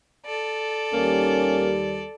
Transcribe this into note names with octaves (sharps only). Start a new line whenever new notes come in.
A4 D5
D#2 G3 A#3 C#4